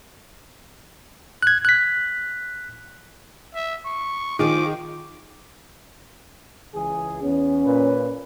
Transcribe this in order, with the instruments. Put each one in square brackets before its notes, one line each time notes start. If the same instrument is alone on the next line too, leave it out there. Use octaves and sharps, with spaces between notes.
[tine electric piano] F#6 G#6
F#6 B6
[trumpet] E5
C#6
[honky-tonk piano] D#3 [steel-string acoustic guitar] F3 F4 G#4 [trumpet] D6
[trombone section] C#2 E3 G#4
[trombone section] E2 B3 [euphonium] C#4
[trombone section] A#2 B4